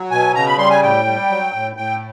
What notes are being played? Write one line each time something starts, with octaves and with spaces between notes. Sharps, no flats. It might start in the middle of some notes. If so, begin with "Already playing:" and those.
Already playing: F#3
B2 G#5
C#3 A#5
B5
G3 C6
G#5
A2 G5
G3
F#3
A2
A2 G5